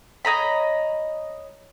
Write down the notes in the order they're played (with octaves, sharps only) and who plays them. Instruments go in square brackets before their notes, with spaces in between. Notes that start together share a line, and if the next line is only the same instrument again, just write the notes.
[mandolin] C#5 D#5 A#5 B5